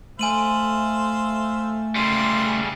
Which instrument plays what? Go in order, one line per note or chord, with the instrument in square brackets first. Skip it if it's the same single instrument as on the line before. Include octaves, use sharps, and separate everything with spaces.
[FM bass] A3 [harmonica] C5 E5 F5 [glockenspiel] G#5 D#7 F#7
[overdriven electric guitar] C#3 G3 [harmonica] A#3 E4 C6